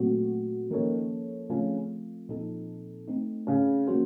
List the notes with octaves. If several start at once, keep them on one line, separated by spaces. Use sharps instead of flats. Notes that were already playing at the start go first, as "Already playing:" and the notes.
Already playing: A#2 F#3 A3 C4 F#4
D#3 F3 A#3 C#4 D#4 A4 C#5
C#3 F3 A3 C4 C#4 F4
A#2 F3 C4 D#4 A4
A3 C4 D#4
C#3 C#4
F3 A#3 C#4 F#4 C5